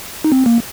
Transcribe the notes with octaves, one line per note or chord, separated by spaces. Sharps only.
D#4
C4
A#3